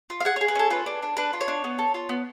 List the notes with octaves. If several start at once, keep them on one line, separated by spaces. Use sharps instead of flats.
F4
F5
G#4 F#5
C#5
G#4
B4
C#4 A4
F4 B4
D4
D4
D4 B4
F4
C#5
D4
B3
A4
F4
B3